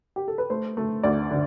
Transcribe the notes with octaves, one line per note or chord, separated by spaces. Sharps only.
G4
A4
B4
A3 C5
A3
D2 D5
D3